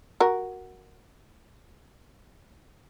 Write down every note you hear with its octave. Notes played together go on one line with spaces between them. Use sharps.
F#4 A#4